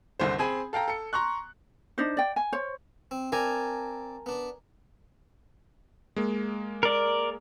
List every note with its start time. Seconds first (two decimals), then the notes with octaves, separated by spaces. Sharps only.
0.20 F#1 C2 D3 C5
0.39 C4 G#4 G#5 B5
0.73 A4 F5 G5 A#5
0.88 A4 C#7
1.13 A#5 C6 C#6 F#6
1.98 D4 D#4 C5
2.17 D5 G5
2.36 G#5
2.53 C5 C#5
3.11 C4
3.32 C4 A#4 D5 G#5 A5
4.26 B3 D4
6.16 G#3 A#3
6.83 A#4 D5